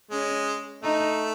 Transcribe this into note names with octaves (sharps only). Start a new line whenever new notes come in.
G#3 C#4
A3 D#4